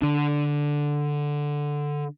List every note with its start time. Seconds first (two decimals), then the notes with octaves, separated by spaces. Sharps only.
0.02 D3 D4